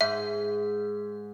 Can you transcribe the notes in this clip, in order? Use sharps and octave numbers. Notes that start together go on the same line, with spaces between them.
G#2 E5